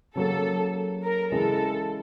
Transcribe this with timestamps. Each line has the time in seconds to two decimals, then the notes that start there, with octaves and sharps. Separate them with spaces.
0.15 C#3 F#3 A#3 A4
1.03 A#4
1.32 C#3 E3 G#3 A4